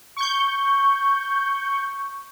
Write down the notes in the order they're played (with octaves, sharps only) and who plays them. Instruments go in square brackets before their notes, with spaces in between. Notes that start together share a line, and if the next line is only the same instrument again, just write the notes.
[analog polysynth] C#6 G6